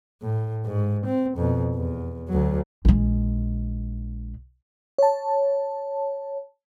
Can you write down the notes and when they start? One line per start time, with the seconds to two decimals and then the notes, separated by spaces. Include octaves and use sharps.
0.22 A2
0.65 G#2
1.06 C4
1.36 F2 B2
1.75 E2
2.29 D2 F#3
2.85 A#1 G#3
4.98 C#5 A5